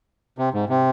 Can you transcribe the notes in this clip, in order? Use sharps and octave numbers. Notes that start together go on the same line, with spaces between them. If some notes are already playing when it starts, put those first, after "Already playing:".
C3
G#2
C3